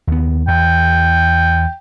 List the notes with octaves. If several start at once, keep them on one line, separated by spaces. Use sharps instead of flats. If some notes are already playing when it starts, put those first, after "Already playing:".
D#2 B3
E2 G5